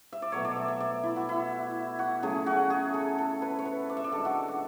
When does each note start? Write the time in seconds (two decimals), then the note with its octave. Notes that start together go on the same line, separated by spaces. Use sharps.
0.13 E5
0.22 D5
0.32 B2 F#3 A3 C#5
0.45 D5
0.57 E5
0.68 E5
0.80 D5
1.03 E4
1.16 F#4
1.29 E4
1.99 F#4
2.22 C#3 F#3 A3 G#4
2.46 F#4
2.70 G#4
2.94 A4
3.18 A4
3.42 B4
3.59 C#5
3.65 B4
3.89 D5
3.97 E5
4.04 D5
4.12 D3 G#3 A4
4.25 F#4
4.48 F#4